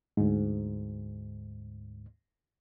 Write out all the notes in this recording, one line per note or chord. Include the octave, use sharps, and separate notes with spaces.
D2 G#2